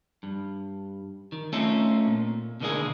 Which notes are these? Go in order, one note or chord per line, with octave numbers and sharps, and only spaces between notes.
G2
D#3
A3 C4 C#4 D#4 F4 A4
A#2
B2 D3 D#3 G#3 A#3 G#4